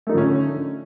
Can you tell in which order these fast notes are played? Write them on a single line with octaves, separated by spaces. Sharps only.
A3 D#4 F3 D3 C#4